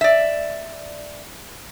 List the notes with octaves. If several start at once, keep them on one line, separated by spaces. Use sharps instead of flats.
D5 E5